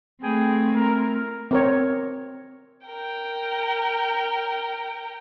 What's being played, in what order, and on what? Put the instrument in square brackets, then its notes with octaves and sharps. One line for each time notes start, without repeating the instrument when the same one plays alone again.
[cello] A3 C4 [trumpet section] G#4 B4 G5
[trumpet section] E4 A#4
[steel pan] C4 A#4 C#5
[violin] A#4 G5